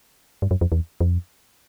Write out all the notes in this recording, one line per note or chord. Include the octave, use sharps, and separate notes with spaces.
G2
F#2
F2
E2
F2